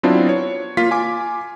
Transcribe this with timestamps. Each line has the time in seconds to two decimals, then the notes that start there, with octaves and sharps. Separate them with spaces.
0.03 F#3 B3 C4 D4 E4 F4
0.29 C#5
0.77 A#3 F4 B6
0.91 F4 G#5 D6